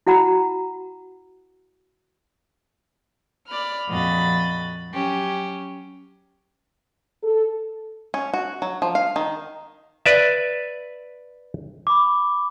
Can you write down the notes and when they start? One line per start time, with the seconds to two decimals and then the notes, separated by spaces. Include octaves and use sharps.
0.07 E4 F#4 F#5 A#5 B5
3.47 D5 B5 F6
3.89 F2 A#2 F#4 D#5 B5 A6
4.92 F#3 C#4 G4
7.24 A4
8.14 C#4
8.34 F#4
8.62 F#3
8.82 F3
8.95 F5
9.16 D#3
10.06 B4 D5 E5
11.87 B5 D6